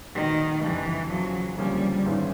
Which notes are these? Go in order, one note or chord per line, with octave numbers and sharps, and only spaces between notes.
A#2 D#3 G3 B3 D#4 F#4
F#1 F2 D3 E3 G3
E2 C#3 F3 F#3
D2 C#3 F3 G3 A#3 C#4
G#1 G#2 E3 G#3 C#4